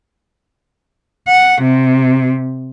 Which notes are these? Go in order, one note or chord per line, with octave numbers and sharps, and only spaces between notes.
F#5
C3